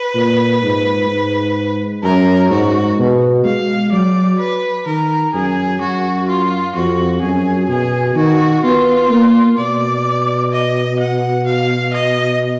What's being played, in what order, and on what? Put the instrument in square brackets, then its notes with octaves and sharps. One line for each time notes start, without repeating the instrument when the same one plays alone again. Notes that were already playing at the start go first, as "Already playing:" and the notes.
Already playing: [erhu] B4
[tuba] A#2
G#2
G#2
[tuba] F#2 [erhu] A#4
[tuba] G#2 [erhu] F#4
[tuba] B2
[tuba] G#3 [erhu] F5
[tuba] F#3 [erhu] D5
[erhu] B4
[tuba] D#3 [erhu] A#4
[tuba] F#2 [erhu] G#4
[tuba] F#2 [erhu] F#4
[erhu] F4
[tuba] F2 [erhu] F#4
[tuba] F#2 [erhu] G#4
[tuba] B2 [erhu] G#4
[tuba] D#3 [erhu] F#4
[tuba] B3 [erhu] F4
[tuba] A#3
[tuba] B2 [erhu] D5
[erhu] D#5
F#5
F5
D#5